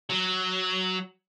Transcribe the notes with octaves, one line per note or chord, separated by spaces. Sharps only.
F#3